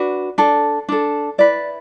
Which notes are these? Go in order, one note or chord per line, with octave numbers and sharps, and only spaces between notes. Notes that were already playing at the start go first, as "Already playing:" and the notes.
Already playing: D4 F#4 B4
D4 A4
D4 A4
E4 B4 D5